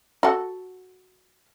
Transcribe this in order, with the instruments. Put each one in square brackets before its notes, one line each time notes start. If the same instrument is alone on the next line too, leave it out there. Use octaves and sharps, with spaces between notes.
[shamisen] F#4 A4